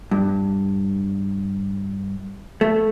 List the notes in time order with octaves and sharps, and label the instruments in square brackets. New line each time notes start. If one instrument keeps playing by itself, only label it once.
[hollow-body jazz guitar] G2
A3